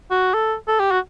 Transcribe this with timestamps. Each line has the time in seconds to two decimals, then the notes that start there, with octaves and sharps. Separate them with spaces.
0.11 F#4
0.34 A4
0.68 A4
0.80 G4
0.91 F#4